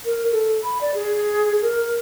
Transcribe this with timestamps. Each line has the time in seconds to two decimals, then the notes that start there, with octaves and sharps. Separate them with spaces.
0.05 A#4
0.32 A4
0.63 B5
0.81 D5
0.94 G#4
1.62 A#4